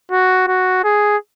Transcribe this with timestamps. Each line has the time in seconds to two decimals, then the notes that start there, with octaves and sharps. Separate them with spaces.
0.11 F#4
0.48 F#4
0.84 G#4